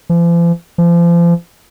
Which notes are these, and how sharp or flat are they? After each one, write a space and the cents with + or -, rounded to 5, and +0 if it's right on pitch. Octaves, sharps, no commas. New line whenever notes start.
F3 -45
F3 -35